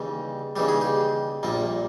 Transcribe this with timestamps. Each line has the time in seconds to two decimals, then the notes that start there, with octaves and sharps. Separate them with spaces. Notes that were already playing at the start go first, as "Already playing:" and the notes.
Already playing: D#2 C#3 E3 G3
0.56 D#2 C#3 E3 G3 G4
0.68 G#4
0.81 G4
1.43 A#1 A#2 G3 A#3